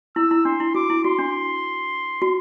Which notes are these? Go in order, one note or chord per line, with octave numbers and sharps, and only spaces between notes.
E4 E6
E4
D4 C6
E4
F#4 D6
E4
F#4 C6
D4
F#4